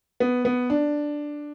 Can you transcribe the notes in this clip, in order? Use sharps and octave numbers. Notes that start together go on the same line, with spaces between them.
B3
B3
D4